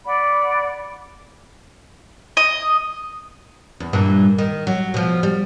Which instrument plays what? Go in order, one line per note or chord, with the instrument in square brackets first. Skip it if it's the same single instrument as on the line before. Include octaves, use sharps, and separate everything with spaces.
[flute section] D5 F#5 B5
[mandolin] D#5
[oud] E2
G2 A#2 E3
D#3
F#3
B2 F3
G3